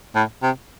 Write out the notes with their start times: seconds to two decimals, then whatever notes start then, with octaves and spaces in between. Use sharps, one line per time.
0.16 A2
0.43 C3